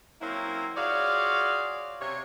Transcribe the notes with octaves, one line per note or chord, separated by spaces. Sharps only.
F#3 A#3 C4 C#4 E4
F4 F#4 G#4 C#5 D5 F5
C3 C#5